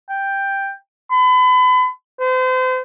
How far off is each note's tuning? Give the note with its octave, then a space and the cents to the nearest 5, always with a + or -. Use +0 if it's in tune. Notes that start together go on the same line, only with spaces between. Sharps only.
G5 +5
B5 +35
C5 -35